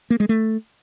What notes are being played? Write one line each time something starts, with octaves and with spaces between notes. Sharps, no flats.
A#3
G#3
A3